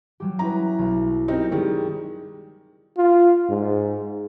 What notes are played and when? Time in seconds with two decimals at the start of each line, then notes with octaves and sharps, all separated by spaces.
0.20 F#3 G3 G4
0.39 C#4 E4 B4 A#5
0.79 B1
1.28 C4 D#4 G4 A#4
1.52 D#3 G3 G#3
2.97 F4
3.49 G#2